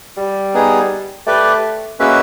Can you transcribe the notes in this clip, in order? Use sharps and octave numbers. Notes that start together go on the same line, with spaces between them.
G3
B3 D#4 G#4
A3 G4 B4 D5
G#3 A#3 C#4 F#4 B4 E5